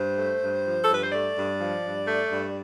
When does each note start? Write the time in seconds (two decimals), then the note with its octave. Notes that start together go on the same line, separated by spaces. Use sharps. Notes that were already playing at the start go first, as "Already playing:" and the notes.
Already playing: G2 C5
0.17 A3
0.42 G2
0.65 F3
0.83 A4
0.89 G2 B4
1.02 C5
1.12 A3 D5
1.37 G2
1.60 F3
1.83 G2
2.08 A3
2.31 G2